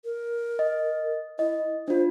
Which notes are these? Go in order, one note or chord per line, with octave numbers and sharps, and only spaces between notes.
A#4
D#5
E4 D#5
D4 F4 C5